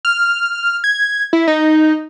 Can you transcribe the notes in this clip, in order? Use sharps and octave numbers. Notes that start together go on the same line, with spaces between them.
F6
G#6
E4
D#4